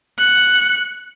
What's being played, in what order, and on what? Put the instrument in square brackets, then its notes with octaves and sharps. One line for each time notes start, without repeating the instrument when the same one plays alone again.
[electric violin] F#6 C#7